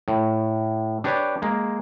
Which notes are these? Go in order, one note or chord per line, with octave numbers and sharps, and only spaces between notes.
A2
D4 G4 B4 C#5
G#3 A#3